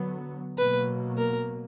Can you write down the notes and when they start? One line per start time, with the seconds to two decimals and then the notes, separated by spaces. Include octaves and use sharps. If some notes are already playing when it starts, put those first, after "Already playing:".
Already playing: D3 F#3 B3
0.57 B2 F#3 A#3 B4
1.18 A#4